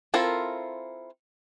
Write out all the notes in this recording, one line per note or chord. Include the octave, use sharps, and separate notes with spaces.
C4 E4 F4 A4 A#4